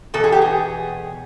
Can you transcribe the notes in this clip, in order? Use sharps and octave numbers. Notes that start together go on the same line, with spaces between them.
E2 B2 A4
G#4
G4
G#4